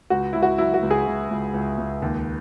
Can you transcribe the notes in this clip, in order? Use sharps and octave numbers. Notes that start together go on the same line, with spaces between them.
C#2 F#4
C#2 E4
F#4
F#3 E4
F#4
C#2
G#4
C#2
C#2
C#2
C#2
D#2